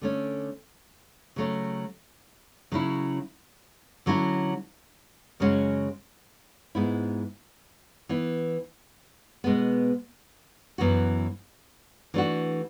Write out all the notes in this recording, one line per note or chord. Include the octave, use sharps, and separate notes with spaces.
D3 A3 C#4
C#3 F#3 A3 C#4
C#3 F#3 C#4 E4
D3 F#3 C#4 E4
F#2 C#3 G#3 C#4 F#4
G#2 G#3 B3 E4
E3 B3 E4
B2 G#3 B3
F#2 E3 B3 F#4
E3 A3 D4 F#4